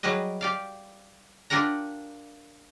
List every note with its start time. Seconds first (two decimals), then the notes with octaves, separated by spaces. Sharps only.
0.03 F#3 G3 G#4 B4 D#5
0.41 G4 D5 F5
1.50 D4 F4 G4 A#4 F#5 A#5